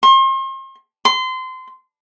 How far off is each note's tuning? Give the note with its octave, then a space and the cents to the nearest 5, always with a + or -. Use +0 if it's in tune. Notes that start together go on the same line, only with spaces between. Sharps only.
C6 +40
C6 -25